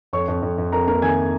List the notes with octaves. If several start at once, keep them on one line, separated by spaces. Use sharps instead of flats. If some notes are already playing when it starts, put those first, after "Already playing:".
F2 C#5 C#6
F2
F2
F2
F2 A#4 A#5
A#3 A#4 A#5
D#3 G#5 G#6